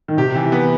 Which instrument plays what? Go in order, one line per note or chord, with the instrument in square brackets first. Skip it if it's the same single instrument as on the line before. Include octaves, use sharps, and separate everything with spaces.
[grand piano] D#3
[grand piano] C3 [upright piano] G4
[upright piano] E3
B3